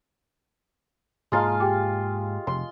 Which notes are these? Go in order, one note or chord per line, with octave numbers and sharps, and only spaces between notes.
G#2 G#3 A#3 F4 F5 A5 A#5 C6
G4 G5 D6
F1 C6